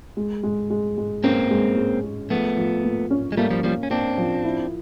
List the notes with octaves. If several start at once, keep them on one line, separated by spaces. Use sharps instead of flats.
G#3
G#3
G#3
G#3
A#3 C4 C#4
G#3
G#3
G#3
F3 A3 B3
F3
A#3
C#4
G#3
G3 A3 A#3
F3 G3
F3 G3 A#3
C#4
A#3 C4 D4
F3
E4